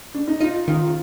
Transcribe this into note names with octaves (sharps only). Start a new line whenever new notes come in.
D4
D#4
D#4 F4
D#3 F4
F4